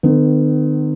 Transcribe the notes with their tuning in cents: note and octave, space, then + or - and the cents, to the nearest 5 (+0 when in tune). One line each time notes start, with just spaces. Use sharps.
D#3 -40 B3 +40